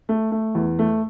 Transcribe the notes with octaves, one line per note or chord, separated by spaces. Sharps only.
A3
A3
E2
A3